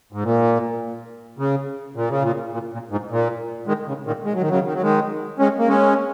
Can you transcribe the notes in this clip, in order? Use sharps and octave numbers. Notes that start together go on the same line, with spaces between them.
G#2
A#2
C#3
A#2
C#3
A#2
A#2
A#2
G#2
A#2
D#3 G#3
C#3
A#2 D#3
G#3
F#3
D#3
C#3 F#3
D#3
F#3
D#3 G#3
G#3 C#4
A#3
G#3 C#4